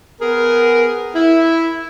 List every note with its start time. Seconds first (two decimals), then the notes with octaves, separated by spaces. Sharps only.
0.21 B3 G#4 A#4
1.15 E4